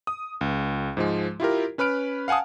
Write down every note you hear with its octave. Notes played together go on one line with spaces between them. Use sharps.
D#6
C#2
G#2 F3 G#3
E4 F4 G4 A#4
C#4 B4 B5 F6 D7
F5 F#5 G#5 A5 D#6